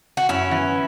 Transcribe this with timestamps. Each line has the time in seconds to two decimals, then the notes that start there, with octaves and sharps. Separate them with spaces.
0.17 F#4
0.29 F#2 C#4 E4
0.51 E3 B3